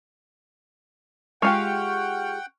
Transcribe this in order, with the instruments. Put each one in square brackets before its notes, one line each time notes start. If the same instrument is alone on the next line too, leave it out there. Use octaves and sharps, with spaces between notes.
[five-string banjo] G#3 F4 G4 [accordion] F#5 G5 [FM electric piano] C#6 F6